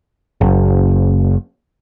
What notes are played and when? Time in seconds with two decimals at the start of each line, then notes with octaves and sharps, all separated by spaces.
0.41 F#1